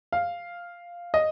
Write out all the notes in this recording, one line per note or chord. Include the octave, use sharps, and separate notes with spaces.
F5
D#5